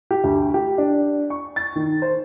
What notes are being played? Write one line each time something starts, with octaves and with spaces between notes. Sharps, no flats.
G4
D2
G4
D4
C#6
A6
D#3
C5